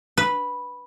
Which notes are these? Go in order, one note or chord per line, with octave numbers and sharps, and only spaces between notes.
B4